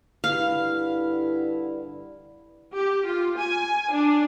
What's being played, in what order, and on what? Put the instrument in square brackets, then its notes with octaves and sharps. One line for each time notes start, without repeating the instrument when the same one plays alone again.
[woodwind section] G2 D3 E4 [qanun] F5
[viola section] G4
F4
G#5
D4